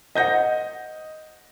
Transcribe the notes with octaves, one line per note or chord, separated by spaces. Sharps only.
C5 D#5 F#5 G6 A#6